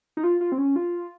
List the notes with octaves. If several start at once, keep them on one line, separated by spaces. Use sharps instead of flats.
D#4
F4
F4
C4
C#4
F4